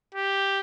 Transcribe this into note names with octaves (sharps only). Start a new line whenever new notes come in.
G4